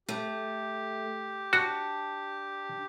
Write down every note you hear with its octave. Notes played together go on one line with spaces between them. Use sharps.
A3 G4
D4 F#4